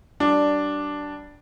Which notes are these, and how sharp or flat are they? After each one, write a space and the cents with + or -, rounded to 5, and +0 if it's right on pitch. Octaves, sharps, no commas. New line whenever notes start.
G3 -25 D4 +0 D5 +5